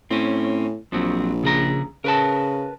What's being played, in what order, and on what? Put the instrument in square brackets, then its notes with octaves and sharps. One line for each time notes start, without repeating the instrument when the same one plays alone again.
[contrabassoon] A2 [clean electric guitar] C4 C#4
[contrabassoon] A#1 [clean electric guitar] F3 F#3 C4
[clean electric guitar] C#3 G#4 A#5
[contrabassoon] C#3 [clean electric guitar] A#4 B4 A5